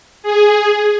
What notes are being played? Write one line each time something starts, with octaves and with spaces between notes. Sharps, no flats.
G#4